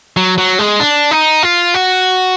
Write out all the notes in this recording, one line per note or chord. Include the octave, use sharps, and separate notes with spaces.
F#3
F#3
G#3
D4
D#4
F4
F#4